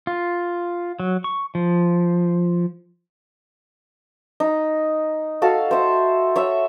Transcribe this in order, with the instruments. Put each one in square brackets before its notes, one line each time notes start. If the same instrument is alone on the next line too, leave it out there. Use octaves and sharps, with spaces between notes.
[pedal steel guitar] F4
F#3
C#6
F3
[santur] D#4
F#4 A4 F5
C5 E5
C#5 E5